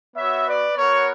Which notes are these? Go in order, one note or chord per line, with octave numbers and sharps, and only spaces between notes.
B3 F#4 C#5 E5
B4 D5
B3 F#4 A#4 C#5